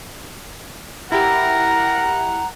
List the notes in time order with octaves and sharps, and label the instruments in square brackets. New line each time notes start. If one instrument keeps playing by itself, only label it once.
[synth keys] E4 G4 [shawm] A#4 [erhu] F#5 [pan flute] A#5